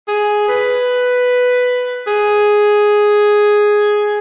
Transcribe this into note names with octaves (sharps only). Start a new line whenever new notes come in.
G#4
B4
G#4